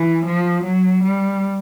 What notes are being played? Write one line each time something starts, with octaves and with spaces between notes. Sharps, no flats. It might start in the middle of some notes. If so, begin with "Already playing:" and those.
Already playing: E3
F3
F#3
G3